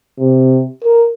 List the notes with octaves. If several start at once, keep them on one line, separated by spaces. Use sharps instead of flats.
C3
A#4